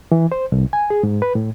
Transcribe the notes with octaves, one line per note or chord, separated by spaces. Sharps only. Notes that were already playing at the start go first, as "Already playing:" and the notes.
E3
C5
C2
G#5
G#4
G#2
B4
A2